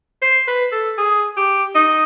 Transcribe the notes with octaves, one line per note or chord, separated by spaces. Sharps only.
C5
B4
A4
G#4
G4
D#4